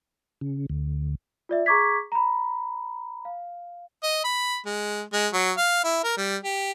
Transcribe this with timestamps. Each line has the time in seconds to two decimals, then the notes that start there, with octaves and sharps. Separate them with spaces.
0.41 C#3
0.70 D2
1.49 F4 D5 E5
1.66 G#4 A#5 C#6 D6 G#6 B6
2.12 A#5 B5
3.25 F5
4.03 D#5
4.24 B5
4.66 G#3
5.13 G#3
5.33 F#3
5.58 F5
5.84 E4
6.04 A#4
6.17 G3
6.43 G4